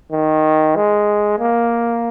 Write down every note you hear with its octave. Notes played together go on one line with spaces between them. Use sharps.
D#3
G#3
A#3